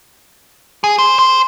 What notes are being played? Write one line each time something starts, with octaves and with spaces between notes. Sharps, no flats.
G#4
C5
C5